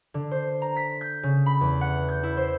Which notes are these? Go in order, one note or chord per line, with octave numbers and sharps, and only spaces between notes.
D3
C5
A#5
B6
G6
C#3
B5
E2
F#5
G6
E4
C5